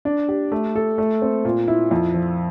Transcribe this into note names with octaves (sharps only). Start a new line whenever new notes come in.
D4
G4
A3
A4
A3
C4
A#2
E4
F2
F3